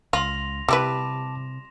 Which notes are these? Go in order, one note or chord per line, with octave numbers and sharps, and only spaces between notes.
C#2 F4 C6 A#6 F7
C3 G3 E4 B4 A5 D6 E7